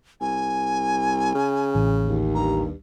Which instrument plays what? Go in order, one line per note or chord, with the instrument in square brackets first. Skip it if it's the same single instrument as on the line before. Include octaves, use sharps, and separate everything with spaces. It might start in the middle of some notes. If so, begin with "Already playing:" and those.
[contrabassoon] C2 [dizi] G#5
[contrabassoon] C#3
[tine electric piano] A1
[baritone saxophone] D#2
[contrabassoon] G2 [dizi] A#5